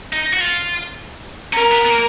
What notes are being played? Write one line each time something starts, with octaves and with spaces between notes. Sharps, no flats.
D#4
F#4
F4
C#4 A#4
B3
B3
A#3